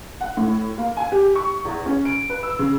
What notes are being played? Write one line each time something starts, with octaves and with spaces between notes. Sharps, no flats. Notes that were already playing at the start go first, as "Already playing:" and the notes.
F#5
A2
A#3
G#5
G4
C#6
E2
C#4
D7
B4
E6
C#3